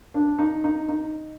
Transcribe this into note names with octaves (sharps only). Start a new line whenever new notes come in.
D4
D#4
D#4
D#4